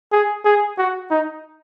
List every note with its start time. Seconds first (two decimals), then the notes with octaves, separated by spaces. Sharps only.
0.12 G#4
0.45 G#4
0.78 F#4
1.11 D#4